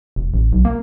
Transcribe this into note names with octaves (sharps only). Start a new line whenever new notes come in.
E1
A1
B1
A#3